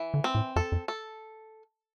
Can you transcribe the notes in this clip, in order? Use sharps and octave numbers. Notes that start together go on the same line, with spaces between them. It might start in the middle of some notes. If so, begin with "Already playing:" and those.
Already playing: E3
D3
C4
A2
F2 A4
F2
A4